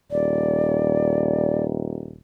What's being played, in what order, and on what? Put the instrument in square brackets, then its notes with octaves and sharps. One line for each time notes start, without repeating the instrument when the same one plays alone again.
[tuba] D#1 [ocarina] D5